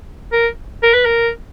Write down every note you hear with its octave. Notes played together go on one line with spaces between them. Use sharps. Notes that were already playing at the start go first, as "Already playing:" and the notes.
A#4
A#4
B4
A#4